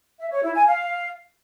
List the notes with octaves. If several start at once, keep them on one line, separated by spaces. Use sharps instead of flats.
E5
C#5
E4
G#5
F5